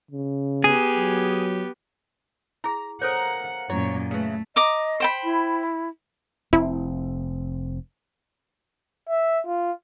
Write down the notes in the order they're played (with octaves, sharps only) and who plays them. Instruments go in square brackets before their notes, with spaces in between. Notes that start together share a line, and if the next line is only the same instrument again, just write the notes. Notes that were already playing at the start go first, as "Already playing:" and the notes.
[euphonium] C#3
[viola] B3 G4 [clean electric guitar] G#4
[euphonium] F#3
[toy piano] E4 G#4 [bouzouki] A#5
[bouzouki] A#3 A#4 [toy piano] A4 C5 C#5 [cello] F#5
[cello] F#2 A#2 [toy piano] E4 [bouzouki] C#5
[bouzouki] C#3 E3 [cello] A3
[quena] D#5 [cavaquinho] A#5 D6 D#6
[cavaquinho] C5 G5 B5
[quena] E4
[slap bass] F1 C4 [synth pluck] E4
[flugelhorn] E5
F4